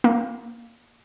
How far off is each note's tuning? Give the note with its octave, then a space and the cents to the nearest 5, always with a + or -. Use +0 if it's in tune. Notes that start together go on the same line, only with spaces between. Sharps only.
A#3 +0